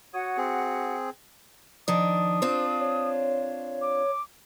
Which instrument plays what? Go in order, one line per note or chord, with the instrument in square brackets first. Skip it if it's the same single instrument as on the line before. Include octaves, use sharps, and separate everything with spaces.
[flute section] F#4 F#5 [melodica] C#5 D#6
[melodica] C4 G#4
[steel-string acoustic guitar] D#3 D4 [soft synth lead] F3 [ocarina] D#6
[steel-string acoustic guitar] C4 D4 F4 [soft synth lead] C5
[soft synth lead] C#5
C#5
[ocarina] D6